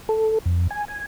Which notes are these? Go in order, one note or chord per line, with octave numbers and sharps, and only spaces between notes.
A4
F2
G#5
G#5